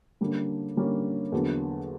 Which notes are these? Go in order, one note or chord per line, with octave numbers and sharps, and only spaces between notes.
D3 G3 A#3 C#4
D3 G3 A#3 C#4
E2 D3 F#3 A#3